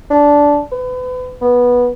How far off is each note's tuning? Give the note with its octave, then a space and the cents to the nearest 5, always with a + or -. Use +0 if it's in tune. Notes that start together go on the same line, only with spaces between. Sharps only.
D4 -15
B4 +35
B3 -15